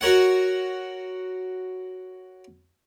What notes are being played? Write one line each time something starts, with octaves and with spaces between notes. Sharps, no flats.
F#4 A#4 C#5 F#5